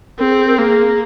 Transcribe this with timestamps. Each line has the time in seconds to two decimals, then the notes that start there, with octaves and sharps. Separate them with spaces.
0.18 C4 G#4 A#4
0.47 A#4
0.58 A#3 G#4